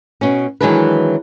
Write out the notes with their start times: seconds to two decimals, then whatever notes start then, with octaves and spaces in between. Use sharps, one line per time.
0.21 B2 C#4
0.61 D#3 E3 F#3 G#3 D4 B4